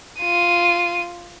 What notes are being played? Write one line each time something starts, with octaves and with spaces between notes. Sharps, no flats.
F4 D#7